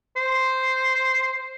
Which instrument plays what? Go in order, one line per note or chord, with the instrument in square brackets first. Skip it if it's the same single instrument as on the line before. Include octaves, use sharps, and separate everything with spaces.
[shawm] C5